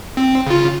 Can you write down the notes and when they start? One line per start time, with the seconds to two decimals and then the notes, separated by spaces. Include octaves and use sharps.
0.17 C4
0.47 C#3 F4